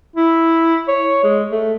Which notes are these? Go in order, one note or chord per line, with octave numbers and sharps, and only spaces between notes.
E4
C#5
G#3
A3